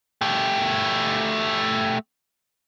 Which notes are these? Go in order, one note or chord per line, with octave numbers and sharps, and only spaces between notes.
A3 G4